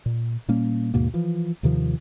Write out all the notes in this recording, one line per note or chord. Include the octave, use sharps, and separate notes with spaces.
A#2
A#2 G3 A#3 C#4
D#2 G#2 B2 A#3
E3 F3
D#2 C3 D#3 F3